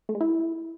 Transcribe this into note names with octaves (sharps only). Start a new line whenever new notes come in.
A3
G#3
E4